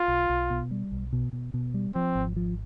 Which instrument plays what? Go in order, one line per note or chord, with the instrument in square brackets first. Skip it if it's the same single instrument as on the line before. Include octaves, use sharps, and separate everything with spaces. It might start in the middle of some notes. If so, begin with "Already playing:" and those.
Already playing: [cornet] F4
[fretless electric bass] B1
B1
B2
G3
B1
B2
B2
B2
G3
[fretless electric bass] F3 [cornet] C4
[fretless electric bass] G#1
F3